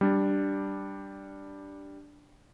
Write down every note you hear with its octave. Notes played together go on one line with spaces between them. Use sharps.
G3 D4